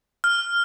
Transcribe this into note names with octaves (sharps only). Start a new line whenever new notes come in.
F6